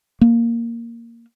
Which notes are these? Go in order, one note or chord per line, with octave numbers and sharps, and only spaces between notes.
A#3